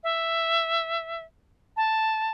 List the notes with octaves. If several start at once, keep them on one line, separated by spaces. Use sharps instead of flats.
E5
A5